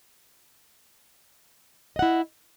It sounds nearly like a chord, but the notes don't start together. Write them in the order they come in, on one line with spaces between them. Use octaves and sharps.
D#5 F#5 E4